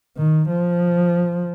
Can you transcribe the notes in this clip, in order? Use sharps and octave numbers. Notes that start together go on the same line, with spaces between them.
D#3
F3